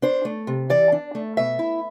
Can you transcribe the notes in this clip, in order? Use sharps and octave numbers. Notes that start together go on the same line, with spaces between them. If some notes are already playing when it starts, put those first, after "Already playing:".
D4 C5
A3
C3
E3 D5
D4
A3
B2 E5
E4